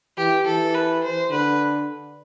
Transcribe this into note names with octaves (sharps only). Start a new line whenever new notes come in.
E3 G4
E3 A4
B4
C5
D3 B4